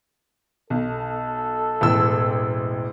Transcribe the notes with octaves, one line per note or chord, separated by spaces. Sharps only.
B1 A4
E1 A1 E6